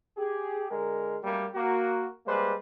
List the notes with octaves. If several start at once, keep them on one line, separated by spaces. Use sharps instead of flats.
G4 G#4
D3 G#3 A#4
F#2 G3 A3 A#3
A#3 F#4
G3 G#3 A#3 B4 C5